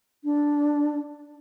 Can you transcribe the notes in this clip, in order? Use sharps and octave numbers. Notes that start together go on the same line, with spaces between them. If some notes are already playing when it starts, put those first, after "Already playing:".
D4